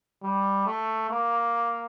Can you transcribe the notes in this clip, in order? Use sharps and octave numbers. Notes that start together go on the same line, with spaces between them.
G3
A3
A#3